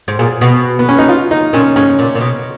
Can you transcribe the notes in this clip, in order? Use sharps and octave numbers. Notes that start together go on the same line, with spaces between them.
G#2
A#2 G#4
B2 F#4
B3
C#4
D#4
F4
D#4
A#2 C#4
G#2 C#4
A#2
A#2
B2